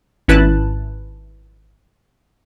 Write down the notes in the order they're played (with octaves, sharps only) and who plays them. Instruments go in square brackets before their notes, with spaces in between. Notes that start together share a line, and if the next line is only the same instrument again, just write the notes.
[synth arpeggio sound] G#1 C#4 E4 B4 A5 F#6